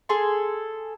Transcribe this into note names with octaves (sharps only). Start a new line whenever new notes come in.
G#4 A4 C6